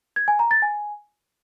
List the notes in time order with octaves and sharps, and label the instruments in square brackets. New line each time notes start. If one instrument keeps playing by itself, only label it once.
[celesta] G#6
G#5
A#5
A6
G#5